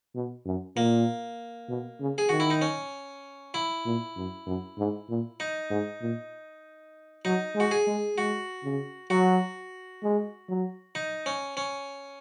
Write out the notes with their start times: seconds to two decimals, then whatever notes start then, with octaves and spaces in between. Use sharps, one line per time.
0.15 B2
0.45 F#2
0.76 A#2 A#3
1.69 B2
2.00 C#3
2.18 G#4
2.29 D#3 F#4
2.40 E4
2.50 D#4
2.62 C#4
3.54 E4
3.85 A#2
4.17 F#2
4.46 F#2
4.78 G#2
5.09 A#2
5.40 D#4
5.70 G#2
6.01 A#2
7.25 F#3 D#4
7.55 G#3
7.60 F#4
7.71 G#4
7.87 G#3
8.17 G#3 F#4
8.64 C#3
9.10 F#3 F#4
10.03 G#3
10.49 F#3
10.95 D#4
11.26 C#4
11.57 C#4